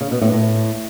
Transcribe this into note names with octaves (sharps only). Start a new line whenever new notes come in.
C#3
B2
A2
A2